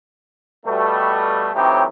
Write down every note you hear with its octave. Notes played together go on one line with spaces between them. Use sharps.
B2 G3 A3
A2 E3 F#3 C4 D#4 G4